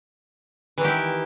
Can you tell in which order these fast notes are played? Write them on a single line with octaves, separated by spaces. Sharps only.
E3 D#3 G4 E4